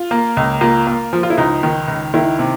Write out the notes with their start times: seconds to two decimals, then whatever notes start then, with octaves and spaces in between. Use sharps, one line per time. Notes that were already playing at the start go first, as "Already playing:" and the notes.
Already playing: F4
0.11 A#3
0.37 C#2
0.61 A#3 F4
0.87 A#3
1.13 F3
1.23 F4
1.30 E4
1.37 C#2 D#4
1.63 D#3
1.88 C#2
2.14 D#3 E4
2.39 C3